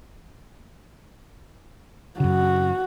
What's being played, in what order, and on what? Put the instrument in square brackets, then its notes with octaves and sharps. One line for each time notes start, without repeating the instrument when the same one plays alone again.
[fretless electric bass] F#2 C#3 [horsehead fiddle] F#4